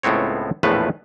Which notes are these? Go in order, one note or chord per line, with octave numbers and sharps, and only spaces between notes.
C#2 A2 B3 C4 C#5
A#1 E2 A2 F3 A3 B4